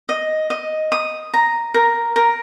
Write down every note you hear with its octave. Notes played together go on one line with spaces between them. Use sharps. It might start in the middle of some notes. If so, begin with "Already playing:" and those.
D#5
D#5
D#6
A#5
A#4
A#4